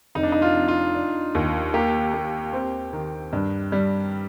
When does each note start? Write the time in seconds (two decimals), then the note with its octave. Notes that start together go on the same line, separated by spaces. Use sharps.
0.15 F1 D#4
0.23 D4
0.32 D#4
0.42 F4
0.55 F2
0.68 F4
0.95 D4
1.35 D#2
1.74 A#3 G4
2.14 A#3
2.53 C4
2.93 D#3
3.33 G2
3.72 G3